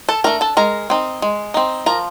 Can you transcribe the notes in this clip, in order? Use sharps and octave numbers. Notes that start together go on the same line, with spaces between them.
A4 A5
A3 D4 A#4 A#5
A4 A5
G#3 A#4 A#5
C4 D#4
G#3
C4 D#4
F3 A#4 A#5